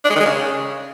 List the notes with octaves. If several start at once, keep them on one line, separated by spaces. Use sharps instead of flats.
D4
G#3
D#3
G#3
C#3